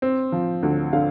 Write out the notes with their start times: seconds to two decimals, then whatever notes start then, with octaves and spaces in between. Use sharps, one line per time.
0.02 C4
0.32 F3
0.63 D2
0.93 D3 F5